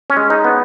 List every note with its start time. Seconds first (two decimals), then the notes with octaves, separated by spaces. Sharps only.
0.10 C#4
0.17 G#3
0.30 D#4
0.45 B3